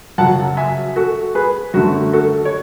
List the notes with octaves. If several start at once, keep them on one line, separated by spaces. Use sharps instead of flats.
F#2 C#3 F#3 F#5 A5
E5 G#5
F#4 A4
G#4 B4
F#2 D3 A3 F#4
F#4 A4
C#5